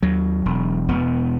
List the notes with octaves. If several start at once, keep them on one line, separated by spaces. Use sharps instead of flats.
D#2 F#3
E1
E1 B3